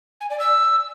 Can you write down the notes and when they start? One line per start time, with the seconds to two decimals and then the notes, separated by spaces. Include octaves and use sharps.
0.21 G#5
0.30 D5
0.39 E6